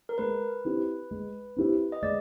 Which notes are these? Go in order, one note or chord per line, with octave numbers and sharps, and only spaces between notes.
A#4
G#3 B4
C4 E4 G4
G#3
C4 E4 G4
D#5
G#3 D5